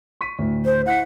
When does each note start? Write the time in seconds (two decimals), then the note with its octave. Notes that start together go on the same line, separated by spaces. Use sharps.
0.21 C#6 B6 D#7
0.39 D2 A2
0.65 C5
0.86 E4 F#5 F#6 B6